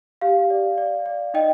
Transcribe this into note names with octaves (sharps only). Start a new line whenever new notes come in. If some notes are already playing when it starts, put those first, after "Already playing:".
G4 F5
D5
D5
D5
D#4 D#5 G5